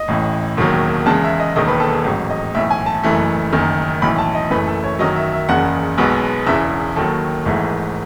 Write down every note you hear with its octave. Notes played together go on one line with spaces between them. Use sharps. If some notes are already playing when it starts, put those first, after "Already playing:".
Already playing: D#5
A1 A2 E3
E1 D#2 D#3 F#3
E2 C#3 G#3 A5
E5
D#5
E1 D#2 D#3 D#5
B4
A4
G#4
A1 G#2 F#3
D#5
B1 A2 E3 E5
G#5
A5
F#1 F#2 E3 A3
F#1 F#2 D#3
B1 A2 E3 B5
A5
D#5
F#1 F#2 E3 A3 B4
A4
C#5
F#2 D#3 F#3 D#5
E5
E5
F#1 E2 C#3 F#5
B1 B2 G#3 B3
E1 E2 C#3 E3 E5
D#2 D#3 F#3 A4
G#1 G#2 E3 A3